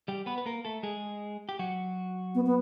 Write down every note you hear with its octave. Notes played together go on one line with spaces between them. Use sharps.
G3 G4
B3 B4
B4
A#3 A#4
A3 A4
G#3 G#4
G4
F#3 F#4
B3
B3